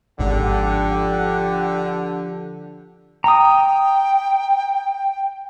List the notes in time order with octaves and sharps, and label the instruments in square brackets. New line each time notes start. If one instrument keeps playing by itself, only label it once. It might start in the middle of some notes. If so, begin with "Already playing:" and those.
[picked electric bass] G#1 G#2 [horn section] D3 [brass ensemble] F3 D4 G4 [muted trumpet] F#5
[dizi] G5 [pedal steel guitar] A#5 D#6